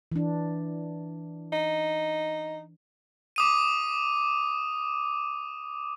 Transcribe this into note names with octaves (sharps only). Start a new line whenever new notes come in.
E3 D4
D#4
D6 D#6 D#7